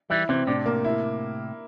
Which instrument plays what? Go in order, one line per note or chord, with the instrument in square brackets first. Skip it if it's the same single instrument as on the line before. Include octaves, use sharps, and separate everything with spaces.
[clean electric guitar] E3 G3 [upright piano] E4
[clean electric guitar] C3 E3 [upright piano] C4
[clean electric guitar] A2 C3 [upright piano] D4
[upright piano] A#3
E4